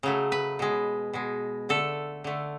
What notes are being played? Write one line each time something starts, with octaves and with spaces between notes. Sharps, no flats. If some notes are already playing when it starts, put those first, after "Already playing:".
C#3 F#3 A3
B4
B2 G#3
B2 G#3
D3 A3 A4
D3 A3